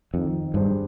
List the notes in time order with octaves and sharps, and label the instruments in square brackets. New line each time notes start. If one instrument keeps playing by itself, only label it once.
[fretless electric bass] F2 [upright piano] D#3
[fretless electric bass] G2 [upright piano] G3 D4 G#4 C5